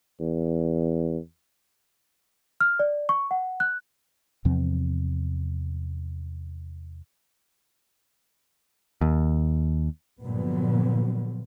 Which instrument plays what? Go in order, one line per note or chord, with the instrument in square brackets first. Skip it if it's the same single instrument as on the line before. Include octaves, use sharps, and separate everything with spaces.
[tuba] E2
[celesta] F6
D5
C#6
F#5
F#6
[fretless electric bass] E2 C3 F3 C4
[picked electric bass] D#2
[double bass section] G2 A#2 D3 F3 F#3 B3